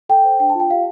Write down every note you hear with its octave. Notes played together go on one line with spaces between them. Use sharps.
A4 G5
C5
D4 G5
A5
F4
G5
G4 F5